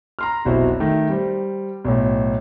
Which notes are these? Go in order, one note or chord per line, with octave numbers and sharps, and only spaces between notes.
A#5 C6 F6
F1 B1 E4 F#4 C5
D#3 A3
G3 C5
B1 A2